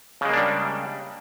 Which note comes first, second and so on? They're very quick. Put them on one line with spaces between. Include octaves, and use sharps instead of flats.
C#3 G#3 A#3 D4 G3